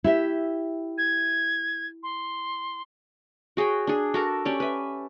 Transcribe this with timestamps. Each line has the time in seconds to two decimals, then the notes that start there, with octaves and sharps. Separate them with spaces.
0.04 E4 G4 E5
0.98 G#6
2.03 C6
3.57 F#4 G#4 C#5 G5
3.87 D4 G#4
4.14 F#4 A4 A#4
4.45 C#4 G4 D5
4.60 B4 E5